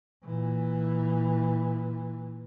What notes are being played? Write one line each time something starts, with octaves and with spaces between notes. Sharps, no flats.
A#2 E3